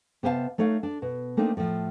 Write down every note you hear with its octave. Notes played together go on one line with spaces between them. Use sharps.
C3 B3 C5 F5 G#5 A5
A3 D#4 C#5 F5
D4
B2
A3 A#3 C4 D4 D#4
A2 F3